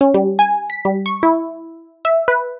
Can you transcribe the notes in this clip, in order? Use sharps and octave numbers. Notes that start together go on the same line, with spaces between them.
C#4
G3
G#5
B6
G3
C#6
E4
E5
B4